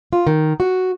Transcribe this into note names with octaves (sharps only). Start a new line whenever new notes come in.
F4
D#3
F#4